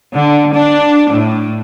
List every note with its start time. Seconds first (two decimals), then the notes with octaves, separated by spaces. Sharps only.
0.13 D3
0.54 D4
1.10 A2